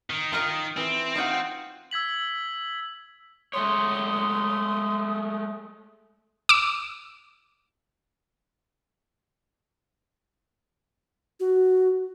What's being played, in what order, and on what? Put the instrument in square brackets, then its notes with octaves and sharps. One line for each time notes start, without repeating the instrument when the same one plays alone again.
[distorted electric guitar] D#3
[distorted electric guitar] D#3 [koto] F4 A#4 D#5
[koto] E3 [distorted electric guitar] C4
[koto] D#4 F4 F#4
[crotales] E6 G#6 B6 F#7
[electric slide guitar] G#3 A3 C#5 [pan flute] C6 [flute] D#6
[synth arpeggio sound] D6 E6
[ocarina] F#4